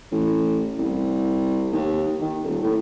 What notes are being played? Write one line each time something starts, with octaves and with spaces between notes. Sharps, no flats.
A1
C2
D#2
D#3
D#1
A2